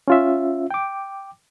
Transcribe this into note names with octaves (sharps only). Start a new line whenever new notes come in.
C#4 F4 E5
G5 D6